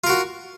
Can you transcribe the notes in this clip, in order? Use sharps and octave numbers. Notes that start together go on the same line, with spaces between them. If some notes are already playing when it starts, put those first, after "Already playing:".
F4 F#4 A#4